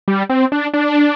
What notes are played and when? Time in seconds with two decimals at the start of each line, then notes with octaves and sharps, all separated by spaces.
0.08 G3
0.30 C4
0.52 D4
0.74 D4